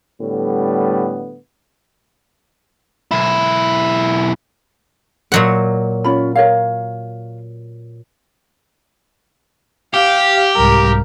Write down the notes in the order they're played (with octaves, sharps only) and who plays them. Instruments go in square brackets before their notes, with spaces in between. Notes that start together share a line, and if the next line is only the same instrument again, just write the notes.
[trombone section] A2 D3 G3 B3
[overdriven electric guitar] B1 E4
[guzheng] A#2 F#3 F#5 [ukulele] C5 D#5
[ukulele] C#4 F4 B5
A#4 C#5 F5
[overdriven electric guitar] G4 [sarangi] F5
[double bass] C2 G#2 [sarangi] A#4